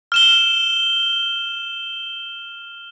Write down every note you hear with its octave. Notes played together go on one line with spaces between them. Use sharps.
F6 E7 G7